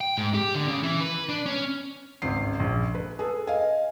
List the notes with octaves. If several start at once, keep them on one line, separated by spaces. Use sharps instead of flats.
G5
G#2
G4
D3
C#3
E3
B4
D4
C#4
G#1 C#2 C7
A#1
B4
G#4 A4 B4
D#5 F5 G#5